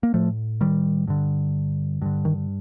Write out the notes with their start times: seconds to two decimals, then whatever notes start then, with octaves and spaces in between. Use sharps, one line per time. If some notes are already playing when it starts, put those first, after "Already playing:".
0.03 A#3
0.14 A2 F3 A3
0.61 D#3 G3
1.07 G2 D3
2.02 G2 D3
2.25 D#3